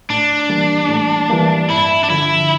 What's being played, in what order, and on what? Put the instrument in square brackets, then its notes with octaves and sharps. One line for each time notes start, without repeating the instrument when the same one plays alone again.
[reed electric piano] A2 [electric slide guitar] D4
[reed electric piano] E3 G3 A#3
A2
E3 G3 A#3
[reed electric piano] G2 [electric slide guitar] E4
[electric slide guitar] D4
[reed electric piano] D3 F3 [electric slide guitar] E4